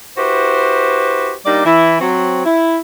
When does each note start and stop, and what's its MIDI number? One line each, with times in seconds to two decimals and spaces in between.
0.17 1.33 64
0.17 1.33 66
0.17 1.33 67
0.17 1.33 71
0.17 1.33 72
1.46 1.61 55
1.46 1.61 58
1.46 1.61 62
1.46 1.61 63
1.46 1.61 74
1.65 2.00 52
1.65 2.00 64
2.01 2.43 54
2.01 2.43 60
2.44 2.78 64